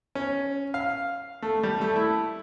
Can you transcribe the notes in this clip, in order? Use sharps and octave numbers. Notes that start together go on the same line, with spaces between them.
C#4
F5
A3
G3
A3
E4